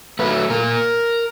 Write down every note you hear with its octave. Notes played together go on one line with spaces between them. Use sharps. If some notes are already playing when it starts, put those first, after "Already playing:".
F#3 A3 B4
A#2 A#4